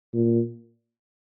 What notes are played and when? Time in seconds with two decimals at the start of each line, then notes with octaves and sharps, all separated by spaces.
0.13 A#2